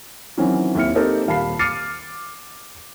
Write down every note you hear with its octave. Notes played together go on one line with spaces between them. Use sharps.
D#3 E3 F#3 C4 C#4
D#2 C4 E4 F6 C#7
A#3 C4 D#4 G4 A4
D#1 F5 A5 B5 C7
D6 F6 A6 C7 C#7 D#7